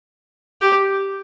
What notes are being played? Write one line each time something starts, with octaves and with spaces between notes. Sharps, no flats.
G4